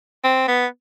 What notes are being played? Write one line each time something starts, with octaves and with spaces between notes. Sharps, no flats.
C4
B3